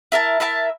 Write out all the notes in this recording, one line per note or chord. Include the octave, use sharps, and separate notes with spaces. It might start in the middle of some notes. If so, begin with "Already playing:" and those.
E4 A#4 E5 A5
E4 A#4 E5 A5